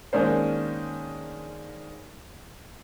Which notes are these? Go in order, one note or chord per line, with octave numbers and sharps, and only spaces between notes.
D#3 G#3 A#3 C#4 D4 C5